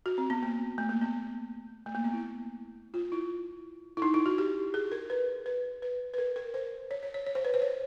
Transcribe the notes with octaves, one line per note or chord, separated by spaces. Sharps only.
F#4
C4
B3
A#3
A3
A#3
B3
A3
A#3
B3
E4
F4
E4
E4
D#4
E4
F#4
G4
G#4
A#4
B4
B4
B4
B4
A#4
A#4
C5
C#5
C#5
C#5
C#5
C5
B4
C5
C#5